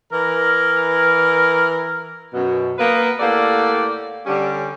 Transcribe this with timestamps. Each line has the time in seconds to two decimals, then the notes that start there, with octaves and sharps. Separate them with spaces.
0.12 E3 A#4
2.34 F#2 B2
2.78 A#3 B3 B4
3.20 A2 A#3 G4 A4 D5 F#5
4.26 D3 G3 C#4